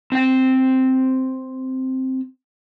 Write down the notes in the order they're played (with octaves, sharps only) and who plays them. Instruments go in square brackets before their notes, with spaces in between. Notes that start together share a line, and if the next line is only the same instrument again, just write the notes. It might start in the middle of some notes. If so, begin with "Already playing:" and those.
[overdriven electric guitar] C4 G5